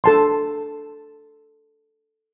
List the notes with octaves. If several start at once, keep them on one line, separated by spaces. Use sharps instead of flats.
A4 A5 C6